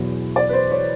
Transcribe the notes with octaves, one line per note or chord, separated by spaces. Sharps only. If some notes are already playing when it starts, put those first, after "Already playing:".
Already playing: E2 B2 F#3
D5
B4
C5
C#5